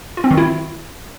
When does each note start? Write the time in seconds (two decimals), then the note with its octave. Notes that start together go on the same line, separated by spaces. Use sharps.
0.17 F4
0.24 C4
0.31 D#3
0.37 E4